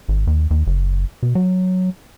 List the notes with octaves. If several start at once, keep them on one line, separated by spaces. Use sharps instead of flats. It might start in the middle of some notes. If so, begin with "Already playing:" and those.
G#1
D#2
D#2
F#1
B2
F#3